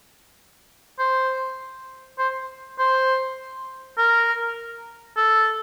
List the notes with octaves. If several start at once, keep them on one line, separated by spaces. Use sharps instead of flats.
C5
C5
C5
A#4
A4